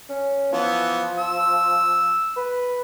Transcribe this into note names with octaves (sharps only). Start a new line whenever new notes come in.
C#4
E3 F3 B3
E6
B4